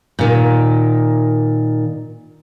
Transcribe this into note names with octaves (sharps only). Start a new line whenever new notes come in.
A#2 D#3